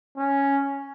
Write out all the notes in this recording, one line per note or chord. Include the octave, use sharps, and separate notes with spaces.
C#4